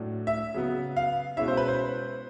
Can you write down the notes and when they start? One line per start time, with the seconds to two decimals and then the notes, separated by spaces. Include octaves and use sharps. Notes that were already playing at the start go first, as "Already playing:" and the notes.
Already playing: A2 F#3 A3 D4
0.27 E5
0.54 C#3 F#3 B3
0.96 F5
1.37 B2 G#3 C#4 E4 E5
1.48 C5
1.57 B4
1.68 C5